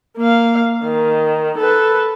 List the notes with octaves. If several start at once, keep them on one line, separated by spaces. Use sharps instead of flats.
A#3 F5
D#3
A4 B4